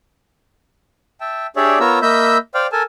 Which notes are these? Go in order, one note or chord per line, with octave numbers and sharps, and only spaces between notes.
E5 G5 A5
D4 G4 G#4 C#5 D5 E5
B3 F4 A#4 C#5 A#5 E6
A#3 D#5 E5 B5 E6 G6
C5 D5 F5 G5 F6
A4 A#4 G#5 A5